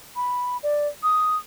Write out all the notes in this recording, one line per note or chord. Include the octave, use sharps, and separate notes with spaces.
B5
D5
D#6